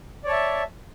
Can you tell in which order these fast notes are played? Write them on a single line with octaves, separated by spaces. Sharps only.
D5 C#5 A5 E5